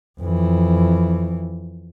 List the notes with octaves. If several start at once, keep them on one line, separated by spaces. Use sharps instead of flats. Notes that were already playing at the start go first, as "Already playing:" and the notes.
F2 E3